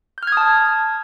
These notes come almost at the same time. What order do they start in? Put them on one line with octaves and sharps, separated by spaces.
G6 F6 G#6 D#6 A5